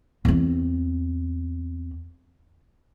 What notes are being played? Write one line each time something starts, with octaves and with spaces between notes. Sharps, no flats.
E2 C4